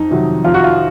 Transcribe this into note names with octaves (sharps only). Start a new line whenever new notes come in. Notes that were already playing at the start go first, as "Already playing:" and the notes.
Already playing: F2 D#4
C3 D#3 F#3
F2 F4
F#4
F4